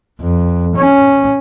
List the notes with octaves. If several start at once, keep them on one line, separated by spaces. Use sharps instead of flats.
F2
C#4